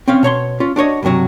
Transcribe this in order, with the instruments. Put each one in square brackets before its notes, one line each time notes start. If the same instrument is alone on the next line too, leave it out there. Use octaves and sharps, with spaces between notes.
[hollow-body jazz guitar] C4 C#4 F5
B2 C#5 A#5 C6
C#4 F4
D4 F#4 C#5 D#5
B1 G2 C3 F#3 F#4